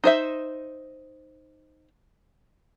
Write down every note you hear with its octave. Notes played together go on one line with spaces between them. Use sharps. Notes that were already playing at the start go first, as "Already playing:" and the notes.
D#4 C5 E5